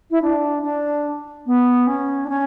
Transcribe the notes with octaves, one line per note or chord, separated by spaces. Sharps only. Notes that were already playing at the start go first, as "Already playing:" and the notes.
E4
D4
D4
B3
C#4
D4
C#4